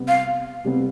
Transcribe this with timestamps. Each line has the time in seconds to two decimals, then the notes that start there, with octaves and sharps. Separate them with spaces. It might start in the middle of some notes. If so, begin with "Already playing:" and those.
Already playing: C3 G3 B3
0.08 F5
0.64 C3 G3 B3